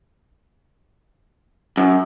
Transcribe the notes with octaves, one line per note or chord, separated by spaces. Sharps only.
F#2